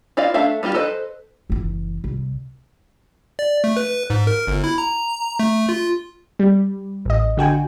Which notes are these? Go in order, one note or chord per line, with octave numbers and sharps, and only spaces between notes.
E4 F4 D5 D#5 F5
A3 D4 A4 E5 F5
G3 A#3 F4 G4
A4 B4 C5 D#5
F#1 E3
C2
D5
A3
B4
G#2
A#4
G1
E4
A#5
A3
F4
G3
A1 D#5
D3 F#4 G5 G#5